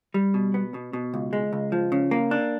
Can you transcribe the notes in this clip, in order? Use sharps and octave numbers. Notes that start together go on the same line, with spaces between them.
G3
B2
B3
B2
B2
C#2
G#3
C#2
F3
C#3
A#3
D4